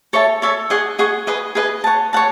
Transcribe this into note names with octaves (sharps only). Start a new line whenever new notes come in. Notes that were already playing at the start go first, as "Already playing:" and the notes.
A4 C#5 E5 A5
A4 C#5 E5 A5
G#4 D#5 F#5 C#6
G#4 D#5 F#5 C#6
G#4 B4 D#5
G#4 B4 D#5
C#5 F#5 A5
C#5 F#5 A5